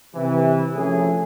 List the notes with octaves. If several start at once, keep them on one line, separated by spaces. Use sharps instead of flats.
C3 E3
F3 A3 C#4 G#4